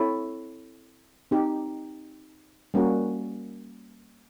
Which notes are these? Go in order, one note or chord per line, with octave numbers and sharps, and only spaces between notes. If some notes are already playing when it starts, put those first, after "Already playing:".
Already playing: C4 E4 A4 C#5
C4 D#4 G4
G3 A#3 C#4 F#4 A#4